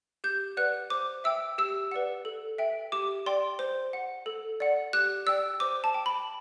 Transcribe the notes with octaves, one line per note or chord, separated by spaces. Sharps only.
G4 G6
B4 D5 F#5 F#6
C5 D6
E5 G5 E6
G4 E6
B4 D5 F#5
A4
E5 G5
G4 D6
D5 G5 C6
C5
F#5
A4
D5 F#5
G4 F#6
D5 G5 E6
C5 D6
A5
G5
B5